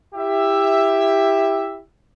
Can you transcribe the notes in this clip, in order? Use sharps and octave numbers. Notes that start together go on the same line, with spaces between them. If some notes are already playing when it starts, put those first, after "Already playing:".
E4 G4 E5